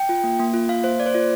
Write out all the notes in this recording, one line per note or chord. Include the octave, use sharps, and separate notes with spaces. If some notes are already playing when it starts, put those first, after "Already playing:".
Already playing: G5
F4
A#3
A#3
F4
A#3 F5
A#3 C5
A#3 D5
C5
F4 D5